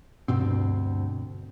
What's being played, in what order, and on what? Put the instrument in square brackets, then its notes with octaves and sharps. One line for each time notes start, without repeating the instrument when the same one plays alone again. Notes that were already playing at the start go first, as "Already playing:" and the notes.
[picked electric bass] D2 G2 B2 C4